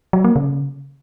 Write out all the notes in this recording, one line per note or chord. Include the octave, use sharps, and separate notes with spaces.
F#3
A#3
C#3